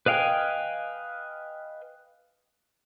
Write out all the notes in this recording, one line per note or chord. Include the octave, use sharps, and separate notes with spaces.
B4 D#5 F5 G5 G#5